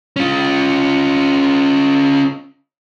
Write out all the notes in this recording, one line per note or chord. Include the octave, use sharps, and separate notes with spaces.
C#4 F4